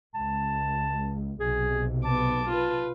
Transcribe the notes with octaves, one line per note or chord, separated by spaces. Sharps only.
C#2 A5
B1 C3 G#4
B3 A5 D6
F4 B4